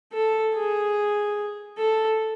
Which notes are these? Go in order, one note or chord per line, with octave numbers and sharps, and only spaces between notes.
A4
G#4
A4